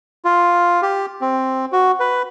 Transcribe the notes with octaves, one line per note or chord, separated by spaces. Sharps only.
F4
G4
C4
F#4
B4